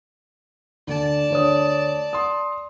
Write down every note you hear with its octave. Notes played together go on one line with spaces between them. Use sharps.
D2 D3 D5 A5
D2 C#5 D#6
C6 D#6